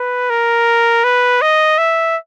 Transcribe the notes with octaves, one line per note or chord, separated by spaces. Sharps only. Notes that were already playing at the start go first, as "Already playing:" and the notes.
Already playing: B4
A#4
B4
D#5
E5